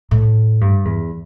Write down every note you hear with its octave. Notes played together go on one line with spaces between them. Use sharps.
A2
G2
E2